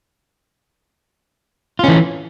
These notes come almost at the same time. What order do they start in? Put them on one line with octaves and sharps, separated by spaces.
F4 C#4 E3